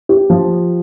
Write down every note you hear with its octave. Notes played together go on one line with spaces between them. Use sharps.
G4
F3